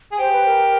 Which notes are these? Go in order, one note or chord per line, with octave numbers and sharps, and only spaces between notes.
G#4
G4 C5
B4
A#4